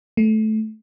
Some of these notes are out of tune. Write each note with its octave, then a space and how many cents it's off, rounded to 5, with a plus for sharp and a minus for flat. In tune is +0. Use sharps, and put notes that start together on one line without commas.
A3 -15